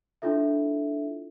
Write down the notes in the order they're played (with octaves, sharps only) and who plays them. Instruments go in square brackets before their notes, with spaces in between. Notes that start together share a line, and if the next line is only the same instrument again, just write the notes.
[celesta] D4 E4 F4 A4 E5